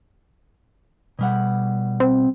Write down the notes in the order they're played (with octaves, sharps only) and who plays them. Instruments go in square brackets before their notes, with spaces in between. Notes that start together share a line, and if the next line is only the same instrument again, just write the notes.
[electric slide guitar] B2 G3 F#5
[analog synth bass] C4